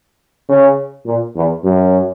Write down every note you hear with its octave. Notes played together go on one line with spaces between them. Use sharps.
C#3
A#2
E2
F#2